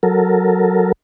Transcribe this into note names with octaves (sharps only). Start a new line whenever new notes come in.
F#3 A4 A#4